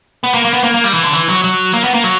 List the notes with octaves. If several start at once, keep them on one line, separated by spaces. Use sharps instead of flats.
B3
A#3
A#3
B3
A#3
A#3
G3
E3
D3
E3
F#3
F#3
A#3
B3
A#3
F#3